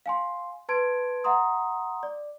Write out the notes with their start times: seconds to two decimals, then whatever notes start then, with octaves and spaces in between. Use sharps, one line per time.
0.06 F5 G#5 C6
0.69 B4 A5 C6 G#6 D7
1.24 E5 F#5 A#5 C6 D#6
2.03 D5